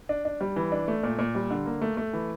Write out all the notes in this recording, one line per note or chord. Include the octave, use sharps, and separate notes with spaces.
D4
D4
G3
E3
D4
A3
A#2
A#2
G3
D3
A#3
A3
A3
E3